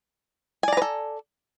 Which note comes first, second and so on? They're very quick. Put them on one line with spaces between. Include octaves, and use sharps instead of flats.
G#5 D5 A#5 B4 A4